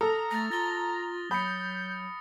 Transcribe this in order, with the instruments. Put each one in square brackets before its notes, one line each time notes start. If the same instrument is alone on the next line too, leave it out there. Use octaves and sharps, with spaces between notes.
[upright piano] A4 [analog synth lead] A#5 [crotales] D#6 F6
[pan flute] A3 [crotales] A6 A#6
[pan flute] F4 [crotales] A6 G7
[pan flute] F#3 [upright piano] B5 [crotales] D#6 A#6 C#7 [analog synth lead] G6